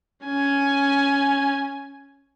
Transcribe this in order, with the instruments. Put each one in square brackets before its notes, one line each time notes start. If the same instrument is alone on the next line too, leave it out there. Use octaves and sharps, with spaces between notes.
[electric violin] C#4 G#5